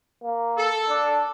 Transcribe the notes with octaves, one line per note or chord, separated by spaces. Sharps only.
A#3
A4
D4